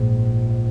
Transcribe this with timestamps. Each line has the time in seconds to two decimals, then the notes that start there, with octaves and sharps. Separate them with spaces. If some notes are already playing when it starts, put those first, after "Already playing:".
Already playing: A#1 G#2